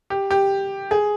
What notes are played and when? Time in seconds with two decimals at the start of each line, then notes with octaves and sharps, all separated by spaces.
0.10 G4
0.31 G4
0.91 G#4